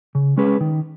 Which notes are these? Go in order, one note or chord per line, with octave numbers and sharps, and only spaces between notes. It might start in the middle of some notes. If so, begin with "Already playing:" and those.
C#3
G#3 C#4 G#4 B4
D#3